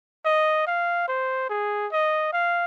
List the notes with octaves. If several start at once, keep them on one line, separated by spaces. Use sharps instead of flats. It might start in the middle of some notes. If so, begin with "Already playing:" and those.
D#5
F5
C5
G#4
D#5
F5